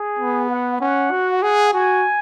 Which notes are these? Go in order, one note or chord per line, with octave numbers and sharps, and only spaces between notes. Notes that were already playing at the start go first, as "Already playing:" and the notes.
Already playing: G#4
B3
F#5
C#4 F#5
F#4
G#4 F#5
F#4 G#5